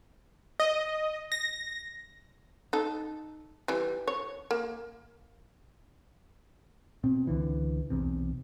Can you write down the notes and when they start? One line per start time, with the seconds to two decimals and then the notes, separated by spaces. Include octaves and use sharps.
0.60 D#5
1.32 A#6
2.73 D#4 A4
3.68 E3 G3
4.07 C#5
4.51 A#3
7.04 B2 C4
7.27 C#2 D3 E3
7.90 B1 E2 C3